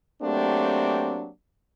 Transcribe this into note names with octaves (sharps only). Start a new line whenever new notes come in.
F#3 A3 A#3 C4 D4 G4